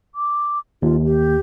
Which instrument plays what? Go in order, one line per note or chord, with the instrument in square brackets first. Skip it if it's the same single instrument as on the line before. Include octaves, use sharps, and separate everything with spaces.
[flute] D6
[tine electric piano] D#2 [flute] F4
[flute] G4